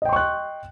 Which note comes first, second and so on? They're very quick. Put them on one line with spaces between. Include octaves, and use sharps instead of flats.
D#5 G5 C6 C#6 F#6